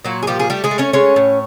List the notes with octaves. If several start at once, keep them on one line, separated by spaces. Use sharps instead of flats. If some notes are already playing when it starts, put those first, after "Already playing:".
A#2 F#3 F#4
G#4
F3 G3 G4
G#4
G3 A3 G4
G#3 G#4
A3
C#4 C#5
G#3 C#4 C#5
A2